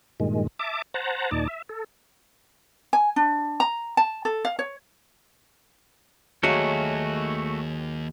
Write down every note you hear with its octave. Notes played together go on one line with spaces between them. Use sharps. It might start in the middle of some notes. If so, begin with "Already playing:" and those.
G2 A#2 D#3 G#3
E5 A5 D6
C5 F#5 A5 A#5
D#2 A#2 D#4 D5 A5
E5
A4
G#5
D4
A#5
A5
A4
F5
C#5
D#2 F#3 G#3 A3 F#4 F5